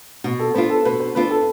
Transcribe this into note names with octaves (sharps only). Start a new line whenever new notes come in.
B2 B3
A4
B3 D4 F4 C5
A4
B2 B4
C5
B3 D4 F4 B4
A4